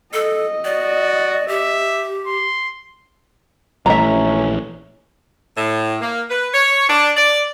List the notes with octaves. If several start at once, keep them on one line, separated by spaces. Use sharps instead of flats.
A4 D#5
F#4 D5
G4 E5
C6
A#1 E3 A3 C#4 E5 A#5
A2
A#3
B4
C#5
D4
D5